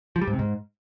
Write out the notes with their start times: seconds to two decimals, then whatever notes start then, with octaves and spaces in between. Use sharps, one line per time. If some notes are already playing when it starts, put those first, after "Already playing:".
0.16 F3
0.22 G3
0.27 G#2
0.33 C3
0.39 G#2